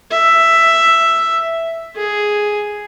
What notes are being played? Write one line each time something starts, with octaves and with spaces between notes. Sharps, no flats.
E5
G#4